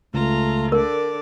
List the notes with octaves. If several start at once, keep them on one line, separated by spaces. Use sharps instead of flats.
C#2 A3 F4 A#5
D3 A#4 D5